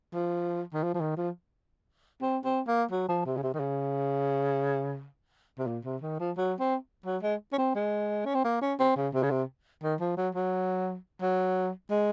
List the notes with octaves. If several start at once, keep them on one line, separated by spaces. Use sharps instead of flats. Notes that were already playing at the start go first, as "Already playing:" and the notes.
F3
D#3
F3
F3
D#3
F3
C4
C4
A#3
F#3
F3
C3
C#3
C3
D#3
C#3
C3
A#2
C3
D#3
F3
F#3
C4
F#3
G#3
C#4
C4
G#3
C#4
C4
A#3
C#4
C4
C#3
C3
C#3
C3
D#3
F3
F#3
F#3
F#3
G#3